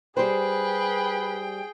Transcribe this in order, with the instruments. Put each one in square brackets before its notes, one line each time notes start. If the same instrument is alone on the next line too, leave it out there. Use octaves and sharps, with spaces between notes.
[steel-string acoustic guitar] G3 G4 C5 [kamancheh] G#4 G5 [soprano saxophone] B4